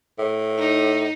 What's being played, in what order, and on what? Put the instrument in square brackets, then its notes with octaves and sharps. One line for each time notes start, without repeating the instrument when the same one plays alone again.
[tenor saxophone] A2
[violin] D#4